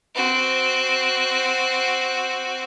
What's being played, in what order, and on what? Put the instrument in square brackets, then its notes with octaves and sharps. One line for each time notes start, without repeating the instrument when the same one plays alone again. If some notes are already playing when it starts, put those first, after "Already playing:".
[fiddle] C4 F#4